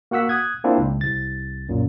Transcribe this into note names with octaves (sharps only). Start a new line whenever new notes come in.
A#3 F#4 F#5 E6 B6
D#6 F#6 G#6
A#3 C4 D4 E4 F4
C#2
C2 A6
F#2 A#2